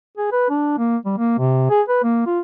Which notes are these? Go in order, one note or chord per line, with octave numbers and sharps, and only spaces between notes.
G#4
B4
D4
A#3
G3
A#3
C3
G#4
B4
A#3
F4